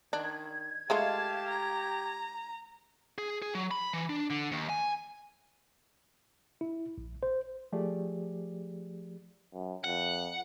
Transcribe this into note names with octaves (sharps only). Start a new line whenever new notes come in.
D#3 D4 G#6
G#3 A3 F4 G4 F5 A5
A#5
G#4
G#4
F#3
B5
E3
D4
D3
D#2
G#5
E4
A#1
C5
F3 A3 G4 G#4 D5
F#2
F2 F#5